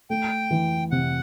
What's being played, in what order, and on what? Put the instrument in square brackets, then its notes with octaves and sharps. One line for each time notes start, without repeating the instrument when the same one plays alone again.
[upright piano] A3 [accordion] G5
[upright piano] E3
[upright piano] C3 [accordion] F#5